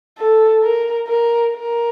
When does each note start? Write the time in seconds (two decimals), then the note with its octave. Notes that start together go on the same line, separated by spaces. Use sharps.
0.19 A4
0.63 A#4
1.08 A#4
1.53 A#4